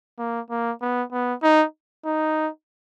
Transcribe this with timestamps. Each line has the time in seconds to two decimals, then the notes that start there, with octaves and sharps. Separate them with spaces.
0.19 A#3
0.50 A#3
0.81 B3
1.12 B3
1.43 D#4
2.05 D#4